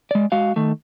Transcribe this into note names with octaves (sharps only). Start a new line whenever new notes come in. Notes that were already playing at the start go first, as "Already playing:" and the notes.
G#3 D5
G#3 F#4 F5
D#3 A3